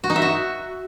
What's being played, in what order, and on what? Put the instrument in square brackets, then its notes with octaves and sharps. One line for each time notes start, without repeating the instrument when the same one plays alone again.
[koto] F#4
D#4
E5
F#4